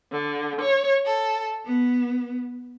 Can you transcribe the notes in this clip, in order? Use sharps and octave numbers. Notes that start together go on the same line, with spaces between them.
D3
C#5
A4
B3